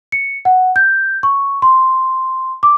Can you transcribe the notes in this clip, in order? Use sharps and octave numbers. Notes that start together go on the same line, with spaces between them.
C#7
F#5
G6
C#6
C6
D6